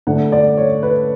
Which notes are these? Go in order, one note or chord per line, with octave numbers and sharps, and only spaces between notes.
D3 A3 D4 F#5
D5
C#5
B4